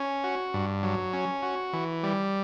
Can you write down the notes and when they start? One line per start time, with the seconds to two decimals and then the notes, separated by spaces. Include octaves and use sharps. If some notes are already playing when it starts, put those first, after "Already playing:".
Already playing: C#4
0.24 F#4
0.54 G2
0.83 F#3
1.13 C#4
1.43 F#4
1.73 E3
2.03 G3